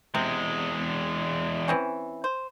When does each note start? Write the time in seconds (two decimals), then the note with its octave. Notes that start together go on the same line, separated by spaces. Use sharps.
0.15 E2 C3 G#3
1.68 E3 C4 C#4
2.24 C5